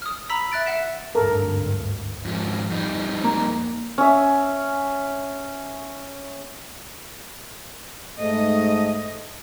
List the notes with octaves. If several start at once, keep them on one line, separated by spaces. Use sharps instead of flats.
D#6 F6
A#5 B5 E6 B6
E5 F#6 A6 D7
E5 F#5 B6 E7
G#1 D2 G2 A4 A#4
F2 G#2 F3
F2 G3 D#4
A#3
C#4 E5
G#2 A3 D#5